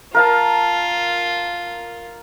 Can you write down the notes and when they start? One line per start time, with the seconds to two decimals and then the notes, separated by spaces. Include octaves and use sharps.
0.15 F4 A#4 F5 A5